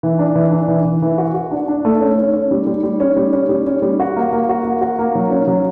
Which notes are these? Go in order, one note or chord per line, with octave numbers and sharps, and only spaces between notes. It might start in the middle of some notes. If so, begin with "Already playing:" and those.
E3
D4
E3
D4
E3
E3
E3
F#4
F#4
D4
D4
A3
C#4
C#4
C#4
G3
G3
G3
C#4
G3
C#4
G3
C#4
G3
F#4
A#3
A#3
F#4
A#3
F#4
A#3
F#3
C#4
F#3